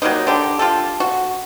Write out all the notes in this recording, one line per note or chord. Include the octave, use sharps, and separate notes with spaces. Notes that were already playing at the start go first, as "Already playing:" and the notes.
F#3 G3 A#3 D#4
D3 G4
F4 G4 A4
F#4